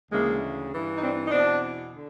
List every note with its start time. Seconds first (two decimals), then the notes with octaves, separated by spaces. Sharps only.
0.11 D2 C#3 E3 G#3 A#3
0.72 G2 E3
0.96 D#4
1.02 C4 D4
1.26 D#4
1.31 E2 B2 C4 D4
1.93 D3